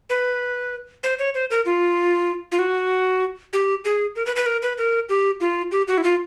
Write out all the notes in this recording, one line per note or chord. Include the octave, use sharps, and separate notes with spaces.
B4
C5
C#5
C5
A#4
F4
F4
F#4
G4
G#4
A#4
B4
B4
A#4
B4
A#4
G4
F4
G4
F#4
E4
F4